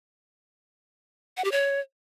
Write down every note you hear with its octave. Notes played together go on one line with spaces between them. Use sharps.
F#5
G4
C#5